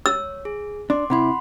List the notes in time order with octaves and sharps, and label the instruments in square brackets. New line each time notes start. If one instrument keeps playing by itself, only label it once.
[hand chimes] C#5 [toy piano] E6
[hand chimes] G#4
[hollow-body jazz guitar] D4 [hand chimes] C6 D6
[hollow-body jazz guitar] C3 E4 [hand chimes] F#5 B5 C6